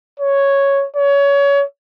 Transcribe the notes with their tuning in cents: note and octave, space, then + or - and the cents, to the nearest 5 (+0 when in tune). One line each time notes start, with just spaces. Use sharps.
C#5 +0
C#5 +25